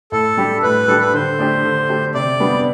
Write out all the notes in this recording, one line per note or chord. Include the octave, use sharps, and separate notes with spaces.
A2 A4
G3 D4 G4
A2 B4
G3 D4 G4 A4
B4
D3 C5
A3 D4 G4
D3
A3 D4 G4
C3 D5
G3 B3 D4